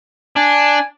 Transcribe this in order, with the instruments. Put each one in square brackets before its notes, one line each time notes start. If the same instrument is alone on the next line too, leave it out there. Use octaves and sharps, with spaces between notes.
[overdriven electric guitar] D4 [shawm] G#5